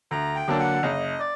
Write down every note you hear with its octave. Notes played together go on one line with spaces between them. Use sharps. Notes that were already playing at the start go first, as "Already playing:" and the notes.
D2 A#5
G5
D3 F#3 A#3 D4
F#5
F#1 D#5
D5